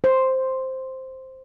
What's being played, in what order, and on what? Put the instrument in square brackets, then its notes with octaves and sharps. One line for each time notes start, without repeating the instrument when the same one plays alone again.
[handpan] C5